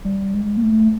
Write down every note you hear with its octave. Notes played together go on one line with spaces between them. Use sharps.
G3
G#3
A#3
A3